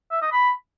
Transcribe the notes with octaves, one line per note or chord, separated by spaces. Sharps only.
E5
D#5
B5